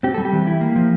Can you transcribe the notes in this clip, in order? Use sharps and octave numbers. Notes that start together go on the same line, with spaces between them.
C4 G4
G3 A4
G4
E3
E4
A#3
F3